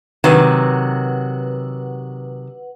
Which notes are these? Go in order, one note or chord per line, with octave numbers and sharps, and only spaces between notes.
C3 D#3 F#3 B4 F#5